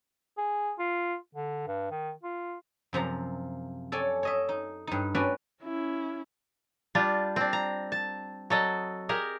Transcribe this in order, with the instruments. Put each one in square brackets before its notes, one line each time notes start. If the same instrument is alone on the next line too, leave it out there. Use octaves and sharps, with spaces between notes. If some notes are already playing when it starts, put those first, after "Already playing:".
[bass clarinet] G#4
F4
D3
G2
D#3
F4
[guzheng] F#2 C3 F3 A#5
A4 C#5 D5 G#5
C#5 D#5 E5
D#4
G2 D#4
C#4 D4 F#4 B4 D5
[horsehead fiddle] C#4 E4
[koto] G3 D4 F4
C4 D4
A#5
A5
F#3 A4 D#5
G4 G#4 A#4